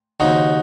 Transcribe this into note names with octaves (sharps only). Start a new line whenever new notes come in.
D#2 C#3 F3 C4 D#4 F#4